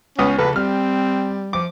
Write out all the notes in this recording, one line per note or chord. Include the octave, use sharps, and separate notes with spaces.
C#2 B3 C#4 D#6
A#1 C#3 A4 B4
G3 C4 F6
F3 D6